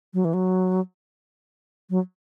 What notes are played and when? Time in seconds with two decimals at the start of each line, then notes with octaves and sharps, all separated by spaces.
0.14 F#3
0.25 E3
0.34 F#3
1.90 F#3